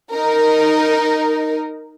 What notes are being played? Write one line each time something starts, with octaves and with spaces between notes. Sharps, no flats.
D#4 A#4